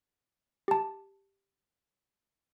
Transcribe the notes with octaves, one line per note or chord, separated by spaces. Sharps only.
G4 A5